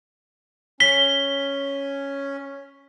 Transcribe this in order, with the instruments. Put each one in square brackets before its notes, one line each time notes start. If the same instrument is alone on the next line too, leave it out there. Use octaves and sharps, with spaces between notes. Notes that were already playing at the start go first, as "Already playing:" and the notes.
[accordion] C#4 [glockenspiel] B6 G7